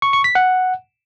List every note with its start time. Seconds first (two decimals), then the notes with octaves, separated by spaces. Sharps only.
0.02 C#6
0.13 C#6
0.24 B6
0.35 F#5